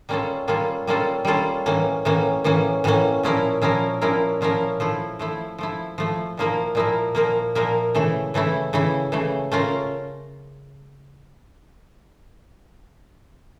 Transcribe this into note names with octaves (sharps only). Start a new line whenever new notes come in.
G3 A#3 C#4 F4 A4
G3 A#3 C#4 F4 A4
G3 A#3 C#4 F4 A4
G3 A#3 C#4 F4 A4
A2 E3 A#3 C#4
A2 E3 A#3 C#4
A2 E3 A#3 C#4
A2 E3 A#3 C#4
A#2 F3 C#4 E4 A#4
A#2 F3 C#4 E4 A#4
A#2 F3 C#4 E4 A#4
A#2 F3 C#4 E4 A#4
F3 A3 E4
F3 A3 E4
F3 A3 E4
F3 A3 E4
A#2 F3 A#3 E4 A#4
A#2 F3 A#3 E4 A#4
A#2 F3 A#3 E4 A#4
A#2 F3 A#3 E4 A#4
C#3 E3 A3 E4
C#3 E3 A3 E4
C#3 E3 A3 E4
C#3 E3 A3 E4
A3 C#4 F4 A#4